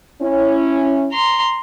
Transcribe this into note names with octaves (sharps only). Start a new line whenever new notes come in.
C#4 E4
A#5 C6